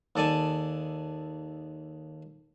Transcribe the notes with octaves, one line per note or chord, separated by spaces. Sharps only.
D#2 A4 D5 G#5 A5